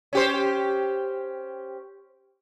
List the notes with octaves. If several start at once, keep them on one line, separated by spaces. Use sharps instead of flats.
C#4 G4 C5